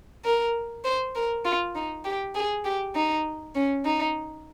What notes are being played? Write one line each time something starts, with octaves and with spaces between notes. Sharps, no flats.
A#4
C5
A#4
F4
D#4
G4
G#4
G4
D#4
C#4
D#4